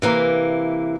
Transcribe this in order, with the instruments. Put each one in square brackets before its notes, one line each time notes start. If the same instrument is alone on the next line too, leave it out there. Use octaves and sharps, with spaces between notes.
[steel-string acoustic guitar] C3 E3 A#3